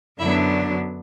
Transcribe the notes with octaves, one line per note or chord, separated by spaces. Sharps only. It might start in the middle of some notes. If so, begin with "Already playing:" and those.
F#2 D3 F#3 B3 D4 E4 E5